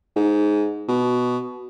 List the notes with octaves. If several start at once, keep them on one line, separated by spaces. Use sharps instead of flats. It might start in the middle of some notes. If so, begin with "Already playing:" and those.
G#2
B2